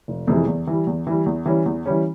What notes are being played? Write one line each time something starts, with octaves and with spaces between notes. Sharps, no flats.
F1
F2 C3 E3 G#3
E2
E3 G3
E2
E3 G3
E2
E3 G3 C#4
E2
E3 G3 C#4